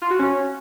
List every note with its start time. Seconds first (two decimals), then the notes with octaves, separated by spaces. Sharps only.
0.02 F4
0.10 F#4
0.19 C#4